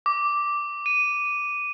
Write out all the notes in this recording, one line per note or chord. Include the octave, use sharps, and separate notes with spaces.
D6
D#7